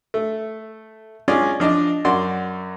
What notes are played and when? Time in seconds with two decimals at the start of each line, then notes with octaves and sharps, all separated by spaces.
0.14 A3
1.28 G#3 C#4 F4 G#4 D5
1.60 F3 D4 D5 D#5
2.05 F#2 F#4 D5 C6